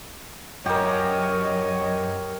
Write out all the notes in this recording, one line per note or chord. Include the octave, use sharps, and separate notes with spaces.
F#2 G4 A#4 C#5 D#5